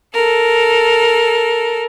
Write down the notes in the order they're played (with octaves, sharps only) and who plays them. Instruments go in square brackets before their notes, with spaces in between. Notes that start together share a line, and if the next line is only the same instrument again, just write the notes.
[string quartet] A4 A#4